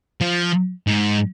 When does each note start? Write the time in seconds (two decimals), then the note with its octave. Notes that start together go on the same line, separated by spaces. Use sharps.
0.21 F3
0.87 G#2